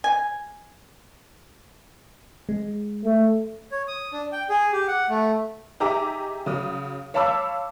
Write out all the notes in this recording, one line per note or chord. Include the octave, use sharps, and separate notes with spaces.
G#5
G#3
A3
C#5
D#6
D4
G5
G#4
G4
F#5
A3
D#4 G4 G#4 E5 A#5 D6
C#3 F#3 D#6
C#5 F5 A5 B5 D6 E6